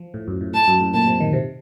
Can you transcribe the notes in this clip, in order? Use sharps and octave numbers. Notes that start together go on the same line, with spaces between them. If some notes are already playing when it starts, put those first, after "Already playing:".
Already playing: F3
A2
F#2
A2
A2 A5
F#2
A2
A#2 A5
C3
D#3
C3